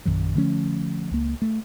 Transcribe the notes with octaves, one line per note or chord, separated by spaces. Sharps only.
A#1 F#2 D#3 F#3
D3 F3 A3 C#4
C#2 A#3
A3